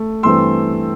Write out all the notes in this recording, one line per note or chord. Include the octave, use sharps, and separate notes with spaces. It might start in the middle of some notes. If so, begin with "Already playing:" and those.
Already playing: A3
G2 E3 A3 C4 C6 E6